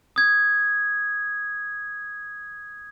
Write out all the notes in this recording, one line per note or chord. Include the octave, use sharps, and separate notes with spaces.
D#6 G#6